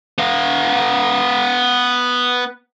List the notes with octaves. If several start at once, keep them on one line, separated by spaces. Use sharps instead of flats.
B3 F5